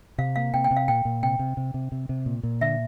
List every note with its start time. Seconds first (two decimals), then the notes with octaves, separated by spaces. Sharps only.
0.18 C3 F5
0.36 A#3 F5
0.54 C3 G5
0.64 G5
0.71 C3
0.77 F5
0.88 A#2 G5
1.05 A#2
1.23 C3 G5
1.39 C3
1.57 C3
1.74 C3
1.92 C3
2.09 C3
2.26 A#2
2.43 A#2
2.61 D3 E5